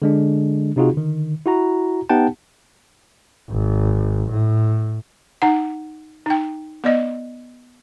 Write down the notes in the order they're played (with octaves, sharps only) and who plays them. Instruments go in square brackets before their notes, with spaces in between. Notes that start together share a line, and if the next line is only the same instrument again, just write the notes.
[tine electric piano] D3 G#3 D4
C3 C4 D#4 F4 F#4 G#4
D3 D#3
E4 F#4 A#5
B3 D#4 G4 F#5 G5 A5
[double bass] G#1
A2
[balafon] D#4 F#5
D#4 G5
B3 D5 D#5